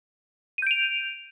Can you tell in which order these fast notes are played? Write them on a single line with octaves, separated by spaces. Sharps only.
D#7 G6 D7 F7